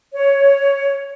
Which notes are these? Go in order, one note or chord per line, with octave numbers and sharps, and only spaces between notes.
C#5